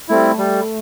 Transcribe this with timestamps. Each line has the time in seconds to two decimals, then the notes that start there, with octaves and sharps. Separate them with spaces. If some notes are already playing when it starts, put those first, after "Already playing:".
0.09 G3 A3 C4 E4
0.38 G3